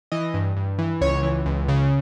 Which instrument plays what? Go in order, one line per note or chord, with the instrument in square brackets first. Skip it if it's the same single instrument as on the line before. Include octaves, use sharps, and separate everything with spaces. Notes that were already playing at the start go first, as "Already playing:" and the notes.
[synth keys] E3 D#5
G2
G2
E3
C#2 C#5
E3
C#2
C#3